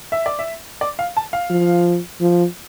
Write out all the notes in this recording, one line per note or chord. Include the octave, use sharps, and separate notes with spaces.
E5
D5
E5
D5
F5
A5
F5
F3
F3